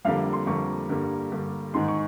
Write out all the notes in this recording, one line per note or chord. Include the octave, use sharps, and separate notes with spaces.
F2 D3 G3 A#3 F5
C6
F2 D3 G3 A#3 C#6
G2 D3 G3 A#3
G2 D3 G3 A#3
G#2 D#3 G#3 C6
C#6